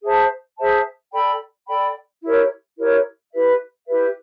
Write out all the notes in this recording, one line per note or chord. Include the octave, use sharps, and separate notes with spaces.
G#4 C5 E5 A5
G#4 C5 E5 A5
A4 D5 G5 B5
A4 D5 G5 B5
E4 G4 A#4 C#5
E4 G4 A#4 C#5
E4 G4 B4 E5
E4 G4 B4 E5